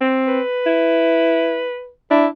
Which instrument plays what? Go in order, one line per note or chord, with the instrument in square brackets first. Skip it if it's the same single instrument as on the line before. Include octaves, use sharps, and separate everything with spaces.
[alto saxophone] C4
[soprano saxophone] B4
[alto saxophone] E4
[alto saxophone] D4 [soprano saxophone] E4